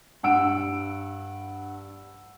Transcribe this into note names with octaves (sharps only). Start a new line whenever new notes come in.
G2 F#5 E6 D7